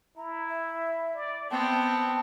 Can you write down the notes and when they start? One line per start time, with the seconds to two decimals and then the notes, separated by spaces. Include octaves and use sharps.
0.17 E4 A#5
0.49 E5
1.14 D5
1.51 B3 C4 G5 A5